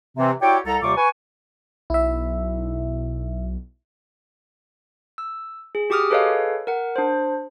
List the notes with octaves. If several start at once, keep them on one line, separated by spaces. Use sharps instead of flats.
C3 E3 C4
E4 F#4 G4 C#5 D5 G5
C2 A4 A#5
D#2 C3 G3 F4 C#6 D6
B4 G#5 C#6
B1 E4 E5
E6
G#4
F#4 G4 D6 D#6 F6
G#4 A4 B4 C#5 D#5 F5
A#4 F#5
D4 C5